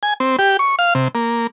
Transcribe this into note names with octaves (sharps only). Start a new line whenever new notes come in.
G#5
C4
G4
C#6
F5
C3
A#3